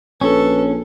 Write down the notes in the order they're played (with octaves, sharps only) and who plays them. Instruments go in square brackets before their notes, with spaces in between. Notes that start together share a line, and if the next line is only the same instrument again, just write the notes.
[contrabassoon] A#1 [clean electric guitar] C#4 [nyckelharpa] A4 [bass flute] B4